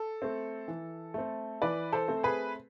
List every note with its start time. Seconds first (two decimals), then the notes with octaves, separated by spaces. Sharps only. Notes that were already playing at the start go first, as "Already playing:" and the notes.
Already playing: A4
0.22 A3 C4
0.68 E3
1.14 A3 C4
1.62 E3 B4 D5
1.92 A4 C5
2.08 A3 C4
2.23 G#4 B4